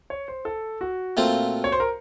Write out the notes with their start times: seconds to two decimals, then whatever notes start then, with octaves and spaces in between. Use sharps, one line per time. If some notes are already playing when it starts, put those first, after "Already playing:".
0.10 C#5
0.28 C5
0.45 A4
0.81 F#4
1.17 A#2 A3 C4 F4 C5
1.64 C#5
1.72 C5
1.80 A#4